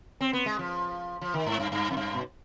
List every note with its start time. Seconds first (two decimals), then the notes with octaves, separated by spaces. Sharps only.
0.21 C4
0.33 B3
0.46 G#3
0.59 F3
1.21 F3
1.34 D#3
1.46 G#2
1.59 G2
1.72 G2
1.91 F2
1.97 G2
2.14 B2